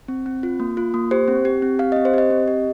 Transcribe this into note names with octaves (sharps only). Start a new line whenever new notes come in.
C4
C4
F4
A#3
F4
A#3
G4 C5
C4
G4
C4
G4 F5
C4 D#5
C5
G4 D#5
C4
G4